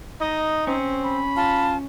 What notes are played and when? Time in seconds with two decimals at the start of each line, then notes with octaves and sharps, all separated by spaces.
0.21 D#4 D#5
0.67 C4 C#4
1.05 B5
1.36 F4 A5